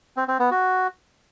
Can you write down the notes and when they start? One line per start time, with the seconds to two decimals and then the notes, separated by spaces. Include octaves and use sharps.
0.17 C4
0.28 C4
0.39 B3
0.51 F#4